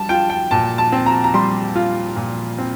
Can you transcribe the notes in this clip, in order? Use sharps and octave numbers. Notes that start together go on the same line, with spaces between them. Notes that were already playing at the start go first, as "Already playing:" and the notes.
Already playing: G3 A5
F4 G5
G5
A#2 A5
A5
C4
A#5
A#5
G3 C6
F4
A#2
C4